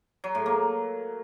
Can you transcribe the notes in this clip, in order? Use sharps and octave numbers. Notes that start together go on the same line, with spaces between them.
F#3
A2
A#3